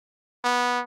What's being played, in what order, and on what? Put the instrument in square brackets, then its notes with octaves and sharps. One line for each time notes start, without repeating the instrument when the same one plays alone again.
[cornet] B3